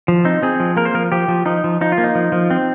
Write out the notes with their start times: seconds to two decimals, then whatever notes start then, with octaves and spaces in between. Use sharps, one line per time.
0.08 F3
0.25 C4 D#4
0.42 C4 G#4
0.60 F3
0.77 A#3 A#4
0.85 C5
0.94 F3 A#4
1.12 F3 G4
1.28 F3
1.46 F3 D#4
1.64 F3
1.81 F3 D#4
1.92 F4
1.98 A#3
2.04 D#4
2.15 F3
2.32 F3
2.50 C4